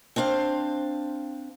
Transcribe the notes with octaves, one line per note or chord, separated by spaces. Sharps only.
C4 D4 C5 F5